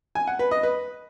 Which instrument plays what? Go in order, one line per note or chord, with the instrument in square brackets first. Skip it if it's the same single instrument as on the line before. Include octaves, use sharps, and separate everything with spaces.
[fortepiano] G#5
F#5
B4
D#5
B4